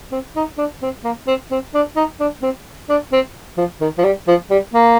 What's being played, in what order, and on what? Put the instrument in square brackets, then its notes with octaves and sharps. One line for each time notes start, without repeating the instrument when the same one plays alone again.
[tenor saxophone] C4
D#4
D4
C4
A#3
C4
C4
D4
D#4
D4
C4
D4
C4
F3
D#3
F3
G3
F3
G3
A#3